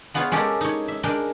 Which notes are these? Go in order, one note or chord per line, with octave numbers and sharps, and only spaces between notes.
G#3 B3 F4 C#5 F5
G#3 C#4 G4 A4 A#4
D#4 C#5
E5
G#3 D4 A#4 G5